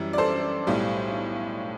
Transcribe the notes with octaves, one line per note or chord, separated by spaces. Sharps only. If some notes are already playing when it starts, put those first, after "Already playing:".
Already playing: F#2 E3 G3
D5
A4 C5
B1 A2 G3